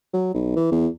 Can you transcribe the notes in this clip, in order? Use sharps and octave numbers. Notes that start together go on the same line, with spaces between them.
F#3
B1
E3
E2